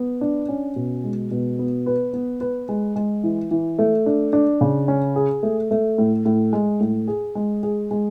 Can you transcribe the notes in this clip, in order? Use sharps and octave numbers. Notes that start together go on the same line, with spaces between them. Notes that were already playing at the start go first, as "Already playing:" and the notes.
Already playing: B3
D4
C#4
B2
G#3
B2
B3
B4
B3
B4
G#3
G#3
E3
E3
A3
D4
D4
C#3
C#4
G#4
A3
A3
A2
A2
G#3
A2
G#4
G#3
G#4
G#3